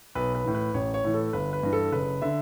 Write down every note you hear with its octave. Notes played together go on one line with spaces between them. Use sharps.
B1 B4
B4
A2 E3
B4
A1 C#5
C#5
A2 E3
A4
G1 B4
B4
G2 E3
A4
F#1 B4
D3 E5